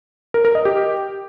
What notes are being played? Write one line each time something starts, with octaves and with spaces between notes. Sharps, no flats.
A#4
A#4
D#5
G4